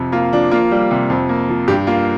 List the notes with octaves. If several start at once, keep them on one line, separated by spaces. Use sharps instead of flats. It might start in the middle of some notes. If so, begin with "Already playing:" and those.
Already playing: F2 C3
A#3 F4
F3 D4
A#3 F4
G3
C3
F2
A#3
F3
G2 G4
A#3 F4